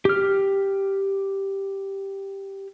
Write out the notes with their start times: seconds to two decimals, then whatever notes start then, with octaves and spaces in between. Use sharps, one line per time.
0.05 G4 F6